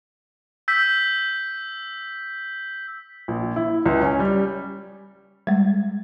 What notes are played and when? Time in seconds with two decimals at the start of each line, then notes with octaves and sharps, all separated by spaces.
0.68 E6 G6 B6
3.28 A#1
3.56 E4
3.85 C#2
4.01 C#4
4.20 G3
5.47 G3 G#3